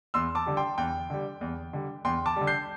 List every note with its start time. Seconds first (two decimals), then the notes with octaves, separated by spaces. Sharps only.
0.14 E2 C6 E6
0.35 A5 D6
0.46 D3 G3
0.57 G5 C6
0.78 E2 G5
1.10 D3 G3
1.41 E2
1.73 D3 G3
2.05 E2 G5 C6
2.26 A5 D6
2.36 G3
2.41 D3
2.47 G6 C7